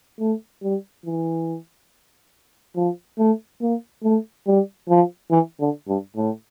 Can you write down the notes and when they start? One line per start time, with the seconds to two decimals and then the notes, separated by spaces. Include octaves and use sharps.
0.20 A3
0.62 G3
1.06 E3
2.76 F3
3.19 A3
3.62 A#3
4.03 A3
4.47 G3
4.89 F3
5.31 E3
5.60 D3
5.88 G2
6.17 A2